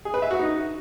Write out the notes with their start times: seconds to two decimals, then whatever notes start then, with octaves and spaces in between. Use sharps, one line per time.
0.05 G#4
0.14 B4
0.22 E5
0.31 F#4
0.39 D#4